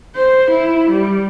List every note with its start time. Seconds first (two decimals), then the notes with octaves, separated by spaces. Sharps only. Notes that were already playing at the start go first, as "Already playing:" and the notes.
0.15 C5
0.50 E4
0.90 G3